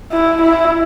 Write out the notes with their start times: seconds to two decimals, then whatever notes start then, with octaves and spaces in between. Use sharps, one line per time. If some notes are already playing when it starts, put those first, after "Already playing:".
0.12 E4
0.42 E4